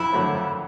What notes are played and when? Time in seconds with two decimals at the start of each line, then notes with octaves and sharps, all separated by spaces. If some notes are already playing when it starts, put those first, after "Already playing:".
Already playing: F2 E4
0.12 D3 F#3 A3 C4
0.35 F2